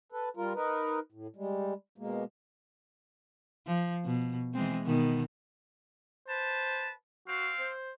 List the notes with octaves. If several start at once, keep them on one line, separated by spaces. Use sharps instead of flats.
A4 B4
G3 F4 A#4
D#4 A#4 B4
A2
G3 G#3
B2 G#3 A#3
F3
B2
E3 G#3 C4
B2 D#3 B3
B4 C5 A5
C4 F#4 F5
C5